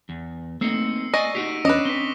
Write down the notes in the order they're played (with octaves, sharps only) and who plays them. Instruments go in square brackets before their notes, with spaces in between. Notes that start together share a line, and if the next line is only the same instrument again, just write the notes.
[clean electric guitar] E2
[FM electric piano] A3 [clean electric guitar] A#3 C4 D#4 [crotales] E6 C7 C#7
[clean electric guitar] D5 G#5 [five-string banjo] D#5 [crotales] C#6 A#6 D#7
[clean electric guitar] D#4 F#4 G4 [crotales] C7 D7
[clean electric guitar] E2 [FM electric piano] C#4 D4 [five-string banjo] B4 D#5 [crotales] D6 D#6 A#6
[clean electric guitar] C4 [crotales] B6 G7